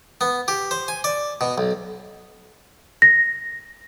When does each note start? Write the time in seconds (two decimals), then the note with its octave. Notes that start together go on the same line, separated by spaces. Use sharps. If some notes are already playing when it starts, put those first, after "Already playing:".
0.21 B3
0.48 G4
0.71 C5
0.88 G#5
1.04 D5
1.41 B2
1.58 B1
3.02 A#6